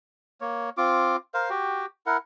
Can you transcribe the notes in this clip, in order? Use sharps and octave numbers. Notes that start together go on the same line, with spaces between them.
A#3 C#5
C4 F4 D6
A#4 C5 F5
F#4 G4 G5
E4 A#4 F#5